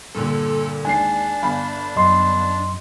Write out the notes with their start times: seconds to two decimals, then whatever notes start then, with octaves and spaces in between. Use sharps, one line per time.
0.15 G2 A#2 D3 A4
0.85 D#2 G#3 D4 D5 G#5 C7
1.42 G1 F5 B5
1.96 F#2 D#5 C6